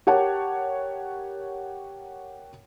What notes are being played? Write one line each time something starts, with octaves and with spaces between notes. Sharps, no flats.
G4 A#4 C#5 F#5 A5